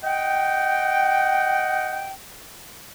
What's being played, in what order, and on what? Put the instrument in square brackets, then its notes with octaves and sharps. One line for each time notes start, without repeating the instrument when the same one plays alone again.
[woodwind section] D#5 F#5 G5